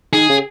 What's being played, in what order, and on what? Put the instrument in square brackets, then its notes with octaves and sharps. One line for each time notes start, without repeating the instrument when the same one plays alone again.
[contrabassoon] D#3 [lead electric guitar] G#4
[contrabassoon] C#3